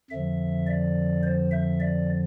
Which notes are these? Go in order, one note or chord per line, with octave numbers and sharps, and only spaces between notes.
F2 D3 F3 E5
D5
C5
E5
D5